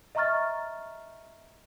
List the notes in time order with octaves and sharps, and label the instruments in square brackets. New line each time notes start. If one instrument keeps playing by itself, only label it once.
[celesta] D#5 E5 A#5 C#6 F6 A6